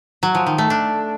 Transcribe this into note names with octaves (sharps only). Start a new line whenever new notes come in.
F#3
F3
D#3
A3
D4